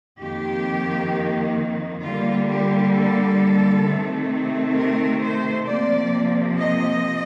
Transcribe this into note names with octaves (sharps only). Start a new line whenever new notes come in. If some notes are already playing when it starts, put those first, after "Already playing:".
F2 D#3 A#3 G4
D3 G3 A#3 F4
G4
A4
C3 D#3 A3 C4
A#4
C5
C3 F3 A#3 D5
D#5